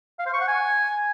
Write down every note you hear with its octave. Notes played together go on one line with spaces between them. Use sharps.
F5
C5
C#6
F#5
G#5